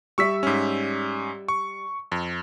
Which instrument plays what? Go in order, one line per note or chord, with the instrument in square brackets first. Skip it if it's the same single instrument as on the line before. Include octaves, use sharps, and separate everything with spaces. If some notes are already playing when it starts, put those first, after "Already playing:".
[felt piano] G3 D5 E5 [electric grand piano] C#6 E6 B6
[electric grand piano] G#2 C#4
C#6
F2